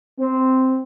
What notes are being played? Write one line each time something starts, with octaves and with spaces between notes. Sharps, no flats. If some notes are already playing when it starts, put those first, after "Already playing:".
C4